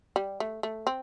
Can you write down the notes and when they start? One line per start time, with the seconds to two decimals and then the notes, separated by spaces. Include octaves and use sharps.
0.16 G3
0.40 A3
0.63 A3
0.87 C4